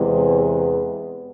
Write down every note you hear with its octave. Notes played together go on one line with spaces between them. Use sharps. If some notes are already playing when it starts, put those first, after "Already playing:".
Already playing: E2 C3 E3 G#3
B3